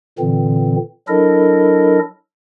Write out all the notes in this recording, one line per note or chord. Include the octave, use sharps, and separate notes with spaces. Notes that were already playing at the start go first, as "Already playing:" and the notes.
A#2 D3 E3 C4
F#3 D4 E4 A4 A#4 D#5